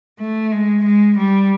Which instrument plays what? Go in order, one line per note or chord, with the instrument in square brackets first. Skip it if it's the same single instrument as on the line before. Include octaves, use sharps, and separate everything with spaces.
[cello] A3
G#3
G#3
G3